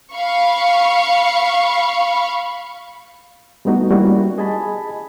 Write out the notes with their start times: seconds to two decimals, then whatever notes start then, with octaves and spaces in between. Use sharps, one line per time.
0.13 F5 B5 C#6
3.65 G3 A3 B3 D#4 F#4
3.91 G3 A#3 C#4 E4 F#4
4.38 G#4 D#5 G#5 A5 B5